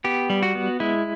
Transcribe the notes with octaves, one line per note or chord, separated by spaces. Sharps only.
B3 G4
G3
F#4
B3
G#3 E4